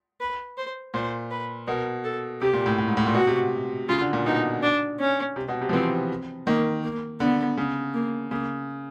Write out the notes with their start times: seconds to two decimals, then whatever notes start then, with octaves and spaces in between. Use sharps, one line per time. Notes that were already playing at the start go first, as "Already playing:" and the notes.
0.20 B4
0.57 C5
0.94 A#2 C5
1.31 B4
1.67 B2 A#4
2.04 A4
2.41 C3 G4
2.53 A#2
2.66 A2
2.78 A2
2.88 G#2
2.97 A2
3.06 A#2
3.14 B2 F#4
3.27 C3
3.89 C#3 F4
4.01 D3
4.13 A#2
4.26 B2 D#4
4.62 D4
4.99 C#4
5.36 C3
5.48 B2
5.61 C3
5.69 F3
5.73 E3 C4
6.47 D#3 A#3
6.83 A#3
7.20 D3 B3
7.57 C#3
7.94 A#3
8.31 C#3 A#3